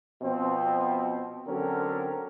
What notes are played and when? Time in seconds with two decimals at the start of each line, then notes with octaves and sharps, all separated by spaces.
0.22 B2 F3 B3 C4
1.46 D3 F#3 C4 C#4 A#4